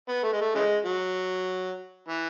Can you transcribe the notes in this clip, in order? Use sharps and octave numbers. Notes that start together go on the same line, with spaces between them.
B3
A3
G#3
A3
C#3 E3 G#3
F#3
E3